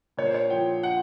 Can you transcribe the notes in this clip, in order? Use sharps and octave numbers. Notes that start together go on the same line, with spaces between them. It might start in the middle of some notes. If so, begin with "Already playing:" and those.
A#2 C#5
C5
C#5
F3 G5
F#5